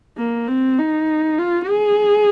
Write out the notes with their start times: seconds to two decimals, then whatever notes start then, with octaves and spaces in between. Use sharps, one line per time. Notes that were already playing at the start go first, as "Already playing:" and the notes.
0.17 A#3
0.47 C4
0.79 D#4
1.39 F4
1.69 G#4